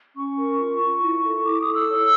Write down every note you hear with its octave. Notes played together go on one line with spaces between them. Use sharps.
C#4 C#6
A#4
F4
F4
E4
A4
E4 D6
D#6
A4
E6
C#5